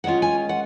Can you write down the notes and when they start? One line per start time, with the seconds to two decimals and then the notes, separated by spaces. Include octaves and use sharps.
0.04 D#3 G#3 C#4 F4 F#5
0.22 G#5
0.49 F#5